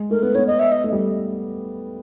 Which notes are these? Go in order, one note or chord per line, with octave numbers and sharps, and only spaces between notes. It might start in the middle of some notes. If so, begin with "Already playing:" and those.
Already playing: G#3
A3 A#4
B3 B4
B3 C#5
D#5
E5
D#5
A3
G3